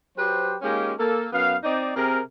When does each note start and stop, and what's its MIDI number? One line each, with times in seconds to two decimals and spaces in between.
0.17 0.55 54
0.17 0.55 67
0.17 0.55 71
0.17 0.55 72
0.62 0.93 56
0.62 0.93 58
0.62 0.93 61
0.62 0.93 63
0.62 0.93 65
0.62 0.93 67
0.99 1.26 58
0.99 1.26 69
1.32 1.55 42
1.32 1.55 59
1.32 1.55 77
1.63 1.94 60
1.63 1.94 63
1.63 1.94 74
1.95 2.20 48
1.95 2.20 68
1.95 2.20 70